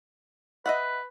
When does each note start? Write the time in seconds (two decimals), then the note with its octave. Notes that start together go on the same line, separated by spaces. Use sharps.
0.66 B4 D#5 E5 F#5